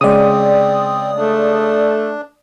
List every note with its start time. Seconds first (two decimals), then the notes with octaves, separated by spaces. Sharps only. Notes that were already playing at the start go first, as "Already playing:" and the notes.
0.01 C#3 G#3 C4 D5 D#6
1.17 A3 D4